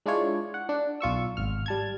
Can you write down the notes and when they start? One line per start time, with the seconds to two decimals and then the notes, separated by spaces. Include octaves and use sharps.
0.06 G#3 D4 E4 F4 C#5
0.54 F#5
0.69 D4
1.01 B1 F4 C#6 E6
1.37 G#1 F6
1.66 G3 A5 G#6